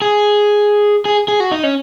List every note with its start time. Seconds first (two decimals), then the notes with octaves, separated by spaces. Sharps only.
0.02 G#4
1.05 G#4
1.28 G#4
1.40 F#4
1.51 D#4
1.63 C#4